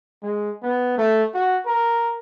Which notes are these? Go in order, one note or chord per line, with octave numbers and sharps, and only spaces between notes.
G#3
B3
A3
F#4
A#4